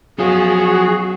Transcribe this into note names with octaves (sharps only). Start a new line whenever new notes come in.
F#2 B2 F3 F4 F#4 G#4